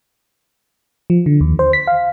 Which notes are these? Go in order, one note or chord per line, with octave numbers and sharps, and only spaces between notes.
F3
D3
D#2
C5
B6
F5